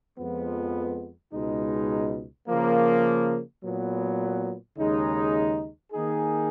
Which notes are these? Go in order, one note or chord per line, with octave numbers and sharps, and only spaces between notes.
F2 F3 G#3 B3
C#2 B2 G#3 D#4
C#3 F3 A#3
A#2 F#3 B3
D#2 C#3 G#3 D#4
D#3 A#3 D#4 G#4